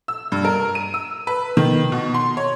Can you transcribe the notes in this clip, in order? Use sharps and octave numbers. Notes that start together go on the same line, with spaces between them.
E6
G2
A#4
D#7
E6
B4
D#3
B2
C6
C#5